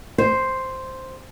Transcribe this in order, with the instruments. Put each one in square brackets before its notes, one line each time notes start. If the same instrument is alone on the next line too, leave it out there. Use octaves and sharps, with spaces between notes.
[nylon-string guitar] C5